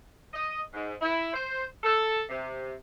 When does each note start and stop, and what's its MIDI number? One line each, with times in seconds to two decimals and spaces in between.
0.34 0.60 75
0.73 0.94 44
1.01 1.33 64
1.34 1.64 72
1.84 2.20 69
2.29 2.75 48